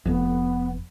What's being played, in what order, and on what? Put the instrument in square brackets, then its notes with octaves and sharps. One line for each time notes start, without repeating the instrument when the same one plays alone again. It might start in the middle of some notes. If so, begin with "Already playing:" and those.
[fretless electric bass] F1 F2 [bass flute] B3